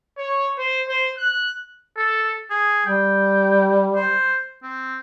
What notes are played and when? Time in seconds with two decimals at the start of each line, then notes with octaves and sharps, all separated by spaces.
0.18 C#5
0.59 C5
0.89 C5
1.17 F#6
1.98 A4
2.50 G#4
2.86 G3 G5
3.96 C5
4.63 C4